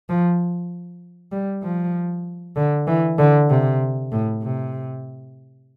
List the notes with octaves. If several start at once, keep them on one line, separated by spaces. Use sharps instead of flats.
F3
G3
F3
D3
E3
D3
C3
A2
C3